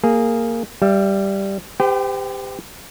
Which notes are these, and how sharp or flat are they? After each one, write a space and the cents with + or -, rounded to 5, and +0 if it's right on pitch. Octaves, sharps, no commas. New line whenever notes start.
A#3 -15 G#4 +0
G3 +0 E5 +35
G4 +20 C5 -45 G5 -30